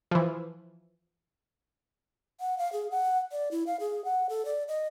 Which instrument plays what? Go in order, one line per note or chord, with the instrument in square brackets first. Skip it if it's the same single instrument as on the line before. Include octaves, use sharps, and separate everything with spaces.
[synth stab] E3 F3
[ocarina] F#5
F5
G#4
F#5
D5
E4
F5
G#4
F#5
A4
D5
D#5